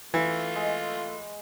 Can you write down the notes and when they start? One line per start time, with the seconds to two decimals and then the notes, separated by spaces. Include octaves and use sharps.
0.14 E3 A3 F4
0.56 G#3